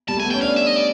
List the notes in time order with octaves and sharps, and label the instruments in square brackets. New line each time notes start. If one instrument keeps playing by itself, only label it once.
[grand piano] G3 [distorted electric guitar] A5
[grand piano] A3
[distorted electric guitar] G#5
[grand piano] B3
[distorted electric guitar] G5
[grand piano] C#4
[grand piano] D4 [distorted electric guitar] F5
[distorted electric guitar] E5
D#5
D5